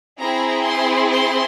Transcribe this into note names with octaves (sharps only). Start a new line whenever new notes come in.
C4 E4 G#4 A#5
C6
C6